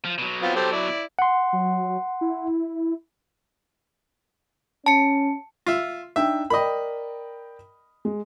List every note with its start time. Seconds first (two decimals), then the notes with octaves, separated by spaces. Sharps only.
0.05 F3
0.18 B2 F#3
0.43 B3 C4 F4
0.56 G4 A4 C5
0.72 E4 D5
1.19 F#5 C6
1.53 F#3
2.21 E4
4.86 C#4 A5 C#7
5.66 F4 E5
6.16 D4 D#4 E5 G5
6.50 A#4 D5 D#5 G5 B5
8.05 G#3